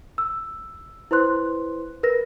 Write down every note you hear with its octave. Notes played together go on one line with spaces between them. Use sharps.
E6
E4 B4 C5 C6 F#6
A#4 B4 A#6